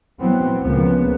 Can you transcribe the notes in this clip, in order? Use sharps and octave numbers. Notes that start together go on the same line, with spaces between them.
E3 F#3 B3 C4
C#2 C#3 F3 A#3 B3